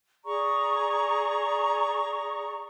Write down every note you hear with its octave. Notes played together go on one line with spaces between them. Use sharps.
G#4 D5 A#5 C#6